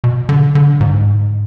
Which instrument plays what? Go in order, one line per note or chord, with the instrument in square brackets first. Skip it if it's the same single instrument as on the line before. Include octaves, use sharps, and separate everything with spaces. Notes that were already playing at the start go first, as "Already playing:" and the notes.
[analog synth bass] B2
D3
D3
G#2